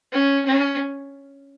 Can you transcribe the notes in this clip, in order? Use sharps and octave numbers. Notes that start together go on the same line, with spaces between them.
C#4
C#4